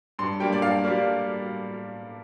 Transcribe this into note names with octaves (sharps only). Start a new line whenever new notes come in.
G2 C6
G3 A#3 D4 G5
D5
G2 F5
G3 A#3 D4